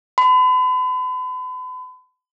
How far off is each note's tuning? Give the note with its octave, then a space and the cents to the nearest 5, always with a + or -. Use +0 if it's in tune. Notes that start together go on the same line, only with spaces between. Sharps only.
B5 +40